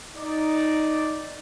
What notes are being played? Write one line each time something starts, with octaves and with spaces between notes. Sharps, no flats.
D#4 D5